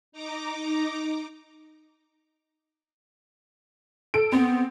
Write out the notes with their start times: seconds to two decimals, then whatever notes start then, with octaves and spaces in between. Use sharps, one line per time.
0.12 D#4 A#5 D6
4.14 A4 D7
4.32 B3 C4